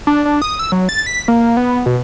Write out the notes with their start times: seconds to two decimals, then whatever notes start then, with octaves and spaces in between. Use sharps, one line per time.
0.07 D4
0.25 D4
0.42 D#6
0.59 E6
0.72 F#3
0.89 A6
1.06 B6
1.28 A#3
1.57 B3
1.86 B2